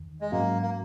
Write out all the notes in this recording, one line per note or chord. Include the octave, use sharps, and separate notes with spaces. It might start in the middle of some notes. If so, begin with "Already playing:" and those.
Already playing: E2 D#3
G#3
G#2 F#3 A#3 C#4 F#4
A#3